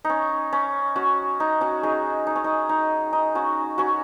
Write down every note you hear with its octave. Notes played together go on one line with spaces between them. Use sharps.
D#4
C#4
C#4
C#4 F#4
D#4
C#4 F#4
D#4 G#4
D#4
C#4
D#4
D#4
D#4
C#4 F#4
C#4 F#4